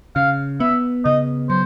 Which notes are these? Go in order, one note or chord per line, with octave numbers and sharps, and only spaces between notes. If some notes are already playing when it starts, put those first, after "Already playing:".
C#3 F5
B3 E5
C#3 D#5
F#3 C5